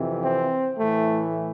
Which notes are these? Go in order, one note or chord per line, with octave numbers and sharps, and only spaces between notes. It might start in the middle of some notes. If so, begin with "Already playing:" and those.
Already playing: F2 C3 E3
C4
A2 E3 A3